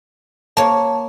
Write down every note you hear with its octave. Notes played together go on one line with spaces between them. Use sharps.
A#3 C#5 A5